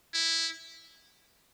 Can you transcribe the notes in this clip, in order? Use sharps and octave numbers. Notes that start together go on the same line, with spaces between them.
E4